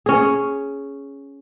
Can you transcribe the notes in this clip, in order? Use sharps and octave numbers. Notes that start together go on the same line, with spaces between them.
C#4 G#4